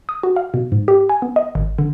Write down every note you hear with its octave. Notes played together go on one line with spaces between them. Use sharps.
D#6
F#4
F5
B2
G#2
G4
G#5
B3
D#5
G#1
D3